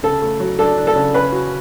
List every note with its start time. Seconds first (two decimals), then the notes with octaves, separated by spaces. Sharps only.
0.03 C#3 A4
0.22 A3
0.40 F#3
0.59 D4 A4
0.77 D4
0.87 A4
0.96 C#3
1.14 C#4 B4
1.32 F#4